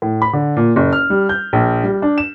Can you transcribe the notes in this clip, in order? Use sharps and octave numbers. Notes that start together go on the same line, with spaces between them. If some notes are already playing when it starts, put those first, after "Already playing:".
A2
B5
D3
A#2
F#1
F6
G3
G6
A#1
G3
D4
E7